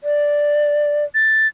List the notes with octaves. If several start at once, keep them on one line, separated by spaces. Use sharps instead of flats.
D5
A6